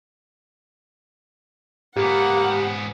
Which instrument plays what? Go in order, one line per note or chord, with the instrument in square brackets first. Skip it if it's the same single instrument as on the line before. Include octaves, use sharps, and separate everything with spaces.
[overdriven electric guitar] G#2 B3 [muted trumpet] A#3 [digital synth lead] G4 [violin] F#5